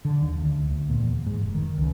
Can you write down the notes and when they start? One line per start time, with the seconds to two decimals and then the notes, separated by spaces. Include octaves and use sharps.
0.05 D3
0.22 D#2
0.41 D2
0.70 D2
0.90 A#2
1.03 E2
1.27 G#2
1.41 F1
1.55 D#3
1.78 C#2